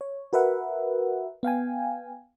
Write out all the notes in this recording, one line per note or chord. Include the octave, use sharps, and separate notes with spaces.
C#5
F#4 A#4 B4 E5 F#5
B3 F5 G5 G#5